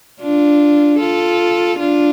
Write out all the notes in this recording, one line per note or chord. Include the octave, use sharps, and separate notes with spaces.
D4 F4
F4 A4
D4 F4